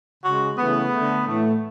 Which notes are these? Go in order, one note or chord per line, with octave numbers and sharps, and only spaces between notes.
C#3 G#3 F#4
C#3 E3 A3 B3
D3 A3
A2 E3 A3